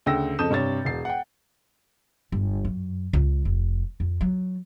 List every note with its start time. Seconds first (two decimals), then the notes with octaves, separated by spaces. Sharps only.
0.06 D2 C#3 G5 E6 A#6
0.39 F2 C#3 A4 D#6 G6 E7
0.50 G2 C3 C#5 A6
0.85 E1 C7
1.05 F#5 G5
2.32 G1
2.65 F#2
3.13 C#2
3.45 F1
4.00 F2
4.21 F#3